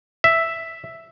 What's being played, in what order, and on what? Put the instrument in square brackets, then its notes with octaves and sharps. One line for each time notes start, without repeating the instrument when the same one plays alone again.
[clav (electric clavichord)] E5